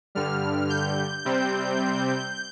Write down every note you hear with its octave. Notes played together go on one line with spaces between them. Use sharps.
G2 D3 G3 F6
G6
C3 G3 C4